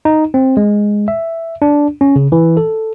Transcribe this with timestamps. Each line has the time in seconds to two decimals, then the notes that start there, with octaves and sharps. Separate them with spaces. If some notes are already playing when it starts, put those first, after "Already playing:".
0.05 D#4
0.34 C4
0.57 G#3
1.08 E5
1.62 D4
2.01 C#4
2.16 C#3
2.32 E3
2.57 A4